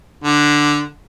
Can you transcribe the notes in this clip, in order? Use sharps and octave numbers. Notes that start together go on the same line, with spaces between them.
D3